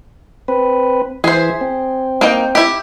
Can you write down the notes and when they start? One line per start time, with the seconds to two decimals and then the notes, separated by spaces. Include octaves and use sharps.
0.48 C4 B4
1.24 E3 G#4 C5 E5
1.61 C4
2.21 A#3 D#4 G5
2.55 E4 G4